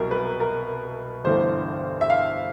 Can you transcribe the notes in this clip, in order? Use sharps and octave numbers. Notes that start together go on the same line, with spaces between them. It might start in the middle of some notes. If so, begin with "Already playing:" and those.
Already playing: C2 B2 F#3 A#4
B4
A#4
G1 G2 E3 A3 C5
E5
F5